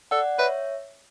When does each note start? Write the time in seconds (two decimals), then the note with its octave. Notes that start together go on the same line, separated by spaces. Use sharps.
0.11 A4 D5 F#5
0.38 B4 C#5 E5